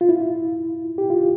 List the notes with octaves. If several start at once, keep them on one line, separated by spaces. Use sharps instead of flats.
F4
E4
G4
F4